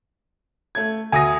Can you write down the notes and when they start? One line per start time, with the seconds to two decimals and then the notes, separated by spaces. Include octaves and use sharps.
0.75 A3 G#6
1.12 D2 G#5 D#6 A#6